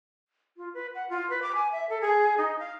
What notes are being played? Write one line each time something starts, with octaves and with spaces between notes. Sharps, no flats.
F4
B4
F#5
F4
B4
D6
G#5
E5
A4
G#4
D#4
F5